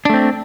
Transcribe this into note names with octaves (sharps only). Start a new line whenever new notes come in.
A3 C4 D4